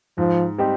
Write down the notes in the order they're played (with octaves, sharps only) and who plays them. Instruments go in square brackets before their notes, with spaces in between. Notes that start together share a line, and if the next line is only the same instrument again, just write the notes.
[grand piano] G#2 [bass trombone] F3
[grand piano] G3 C4 D#4 G4